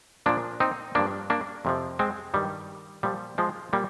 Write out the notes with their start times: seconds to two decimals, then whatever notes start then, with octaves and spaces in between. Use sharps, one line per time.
0.26 A#2 F3 A#3 D4
0.60 C4 D#4
0.95 G2 F3 A#3 D4
1.30 A#3 D4
1.65 F2 C3 F3
1.99 G#3 C4
2.34 G2 D#3 G3
3.03 A#2 F3 G3
3.38 F3 G#3
3.73 A#2 G3 A#3